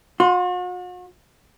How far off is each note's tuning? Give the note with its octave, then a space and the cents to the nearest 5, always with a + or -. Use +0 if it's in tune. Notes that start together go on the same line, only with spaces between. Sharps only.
F#4 -45 C6 -5